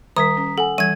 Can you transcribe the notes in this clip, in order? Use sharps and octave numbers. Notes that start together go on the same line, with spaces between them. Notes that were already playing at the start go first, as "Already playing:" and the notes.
D#3 G3 A#4 A#5 D#6 B6
C#4
A4 F#5 G#5
E3 G3 G#6 D#7